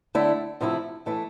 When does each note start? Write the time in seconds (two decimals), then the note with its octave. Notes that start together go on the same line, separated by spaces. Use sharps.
0.15 D3 A3 E4
0.61 C3 F3 A3 E4
1.06 E3 A3 E4